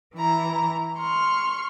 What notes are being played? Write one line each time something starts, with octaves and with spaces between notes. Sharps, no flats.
E3 E4 A#5
C6 C#6 F6